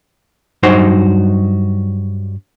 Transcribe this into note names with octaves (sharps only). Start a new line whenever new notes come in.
G2 F#3 D#4 F#4 C5